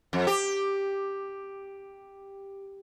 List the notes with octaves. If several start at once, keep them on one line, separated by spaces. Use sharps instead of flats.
F2
G4